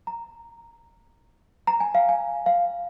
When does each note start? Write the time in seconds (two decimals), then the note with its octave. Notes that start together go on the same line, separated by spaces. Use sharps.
0.07 A#5
1.67 A#5
1.80 G#5
1.95 F5
2.09 G#5
2.46 F5